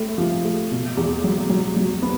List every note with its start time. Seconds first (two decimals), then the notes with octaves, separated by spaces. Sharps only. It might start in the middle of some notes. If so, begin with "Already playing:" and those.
Already playing: A2 A3
0.18 F3
0.44 A3
0.71 B2
0.97 E2
1.24 F#3
1.50 F#3
1.76 F#3
2.02 B3